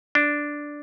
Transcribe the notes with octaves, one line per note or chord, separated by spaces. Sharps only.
D4